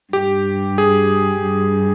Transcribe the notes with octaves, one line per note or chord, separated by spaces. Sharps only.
G2 G4
G#4
G2